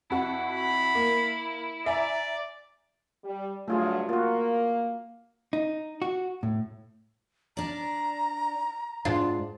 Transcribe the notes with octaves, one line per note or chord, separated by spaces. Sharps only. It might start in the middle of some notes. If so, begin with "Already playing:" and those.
F2 E4 F#4
B5
A#3
D5 E5 G#5 A#5
G3
G2 F#3 A3 F4 G#4
A#3 F4 F#4
D#4
F#4
A2
D4 D5 A#5
G#2 D4 F4